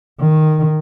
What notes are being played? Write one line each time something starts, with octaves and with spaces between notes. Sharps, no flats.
D#3